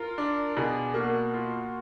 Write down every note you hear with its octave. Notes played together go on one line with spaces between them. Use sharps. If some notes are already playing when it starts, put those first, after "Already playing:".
Already playing: F4 A#4
D4
B2 G#4
A#3 F#4
F4